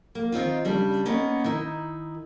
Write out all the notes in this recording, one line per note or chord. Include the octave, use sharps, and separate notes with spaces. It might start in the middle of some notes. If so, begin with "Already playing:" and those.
A#3
D#3 C4 D#4 F4
C#3 G3 D4
A#3 B3 C#4 D#4
D#3 D#4 E4